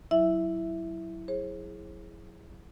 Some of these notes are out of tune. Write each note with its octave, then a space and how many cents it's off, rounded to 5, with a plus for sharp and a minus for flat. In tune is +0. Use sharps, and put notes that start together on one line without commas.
F#3 +0 E4 +0 E5 +0
G#4 +0 C5 +45